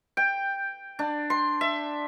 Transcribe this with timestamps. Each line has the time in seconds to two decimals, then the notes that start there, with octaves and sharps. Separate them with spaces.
0.17 G5
0.99 D4
1.30 C6
1.61 E5